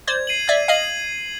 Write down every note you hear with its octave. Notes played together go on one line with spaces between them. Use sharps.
C5 D5 G#6
C7 D#7 F#7
D5 E5 G#6
D#5 F5 C7 D#7 F#7